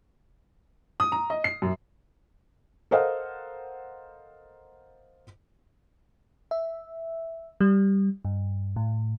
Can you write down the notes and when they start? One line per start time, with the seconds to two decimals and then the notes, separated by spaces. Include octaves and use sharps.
1.00 D#6
1.12 A#5
1.30 D#5
1.44 C7
1.62 F#2
2.91 A4 A#4 C5 D#5 F5 F#5
6.51 E5
7.61 G3
8.25 G2
8.76 A2